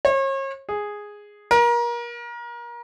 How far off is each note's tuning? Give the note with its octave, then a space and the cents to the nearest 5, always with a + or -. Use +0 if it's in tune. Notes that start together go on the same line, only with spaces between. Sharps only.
C#5 -40
G#4 -5
A#4 +30